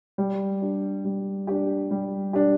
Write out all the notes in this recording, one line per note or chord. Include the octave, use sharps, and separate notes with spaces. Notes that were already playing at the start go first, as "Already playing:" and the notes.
G3
D4 G4
G3
D4 G4
G3
D4 G4